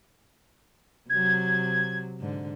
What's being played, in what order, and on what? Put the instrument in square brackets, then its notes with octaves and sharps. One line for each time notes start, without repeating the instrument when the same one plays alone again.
[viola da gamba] C3 F#3 [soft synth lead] G#6
[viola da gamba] G#2 D3